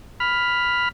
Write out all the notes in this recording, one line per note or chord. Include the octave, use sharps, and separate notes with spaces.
B5 F6